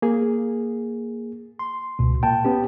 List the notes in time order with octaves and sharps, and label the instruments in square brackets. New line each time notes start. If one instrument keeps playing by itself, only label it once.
[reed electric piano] A#3 G#4
C6
[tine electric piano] C#2 B2
[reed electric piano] A#2 [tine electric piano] G5 A5
[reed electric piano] B3 C#4 G4